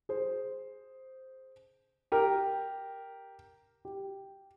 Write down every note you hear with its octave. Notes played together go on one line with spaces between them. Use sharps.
G#4 C5
G4 A#4
G4